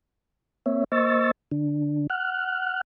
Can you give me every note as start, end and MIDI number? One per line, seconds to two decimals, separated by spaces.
0.66 0.84 58
0.66 0.84 60
0.66 0.84 73
0.66 0.84 76
0.92 1.31 58
0.92 1.31 72
0.92 1.31 75
0.92 1.31 85
0.92 1.31 88
0.92 1.31 93
1.52 2.07 50
1.52 2.07 62
2.10 2.81 78
2.10 2.81 89
2.10 2.81 90